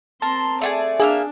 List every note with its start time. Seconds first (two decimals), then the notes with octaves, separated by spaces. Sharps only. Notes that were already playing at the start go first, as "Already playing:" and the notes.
0.22 C4 A#4 A5 C6
0.61 A3 F4 G#4 D5
1.00 A#3 D4 G#4 E5 F6